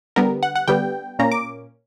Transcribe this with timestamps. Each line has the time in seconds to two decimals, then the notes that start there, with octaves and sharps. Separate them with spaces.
0.16 D3 G3 B3 A#4
0.43 F#5
0.56 F#5
0.68 D3 G3 B3 G5
1.19 A#2 A#3 C#4 A#5
1.32 D6